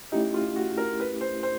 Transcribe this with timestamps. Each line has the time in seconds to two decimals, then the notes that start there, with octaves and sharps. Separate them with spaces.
0.12 A3 C#4 D#4 E4 G4
0.34 F4
0.56 F#4
0.78 A#4
1.00 B4
1.21 C5
1.43 C5